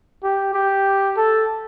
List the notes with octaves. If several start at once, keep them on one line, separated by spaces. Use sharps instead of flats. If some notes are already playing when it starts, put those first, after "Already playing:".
G4
G4
A4